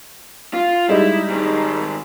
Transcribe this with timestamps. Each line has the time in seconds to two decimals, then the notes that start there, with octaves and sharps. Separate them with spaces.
0.54 F4
0.89 G3 G#3 D#4 E4
1.30 G#2 D#3